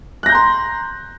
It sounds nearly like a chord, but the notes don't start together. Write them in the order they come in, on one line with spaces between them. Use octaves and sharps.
F#6 A#6 G6 A#5 C6